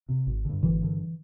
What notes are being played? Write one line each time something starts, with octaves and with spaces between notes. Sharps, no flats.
C3
G#1
G2 D3
G#1 D3 E3
G2 D3